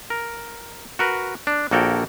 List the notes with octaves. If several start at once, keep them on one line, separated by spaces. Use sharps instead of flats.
A#4
F#4 A#4 B4
D4
A#1 A#3 F#4 A4 A#4 G5